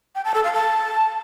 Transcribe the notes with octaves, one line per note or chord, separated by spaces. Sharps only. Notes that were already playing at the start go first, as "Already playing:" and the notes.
G5
A5
A4
F5
A5